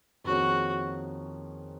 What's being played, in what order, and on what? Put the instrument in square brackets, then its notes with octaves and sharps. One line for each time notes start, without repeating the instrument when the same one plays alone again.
[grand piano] F2 D#3 A#3 C#4 G#4 [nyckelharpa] F#4